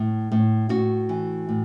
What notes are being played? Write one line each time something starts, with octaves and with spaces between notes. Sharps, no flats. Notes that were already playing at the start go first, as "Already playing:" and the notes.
Already playing: A2
A2
A2 F#4
E3
A2